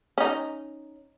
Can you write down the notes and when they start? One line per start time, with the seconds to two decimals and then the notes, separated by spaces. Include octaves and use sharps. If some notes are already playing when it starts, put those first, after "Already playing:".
0.18 C#4 D#4